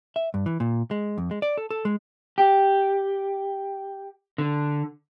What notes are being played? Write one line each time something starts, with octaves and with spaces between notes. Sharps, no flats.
E5
G2
E3
A#2
G#3
F2
G#3
D5
A4
A4
G#3
G4
D3